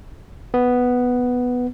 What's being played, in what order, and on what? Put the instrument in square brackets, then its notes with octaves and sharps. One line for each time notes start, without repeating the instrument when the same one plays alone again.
[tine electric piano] B3